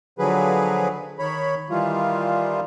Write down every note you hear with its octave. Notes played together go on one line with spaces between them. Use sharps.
D3 F3 F#3 G#4 B4
D#3 C#5 B5
D#3 E3 G3 F4